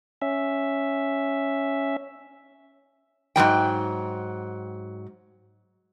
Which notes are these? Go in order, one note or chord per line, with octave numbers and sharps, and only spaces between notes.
C#4 E5
G#2 F#3 G3 G5